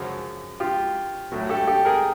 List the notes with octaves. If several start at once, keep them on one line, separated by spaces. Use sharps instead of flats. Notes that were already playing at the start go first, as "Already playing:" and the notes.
Already playing: F#2 C#3 F3
F4 G4
A2 F#3 A3
G4 A4
G4 A4
G#4 A#4